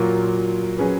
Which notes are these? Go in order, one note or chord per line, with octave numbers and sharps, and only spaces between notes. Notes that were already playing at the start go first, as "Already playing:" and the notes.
Already playing: A#2 F#3 A#3 F4 A#4
F#3 C#4 G#4 B4